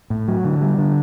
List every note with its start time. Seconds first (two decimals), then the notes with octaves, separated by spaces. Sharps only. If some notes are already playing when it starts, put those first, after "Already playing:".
0.10 A2
0.28 F#3
0.45 D3
0.61 G3
0.79 D3